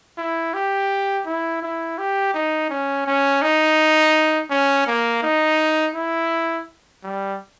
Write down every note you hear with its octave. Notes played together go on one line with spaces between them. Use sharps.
E4
G4
E4
E4
G4
D#4
C#4
C#4
D#4
C#4
A#3
D#4
E4
G3